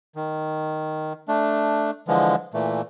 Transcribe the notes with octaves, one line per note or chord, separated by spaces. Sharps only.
D#3
A3 D4
D3 E3 F3 G#3
A#2 E3 A3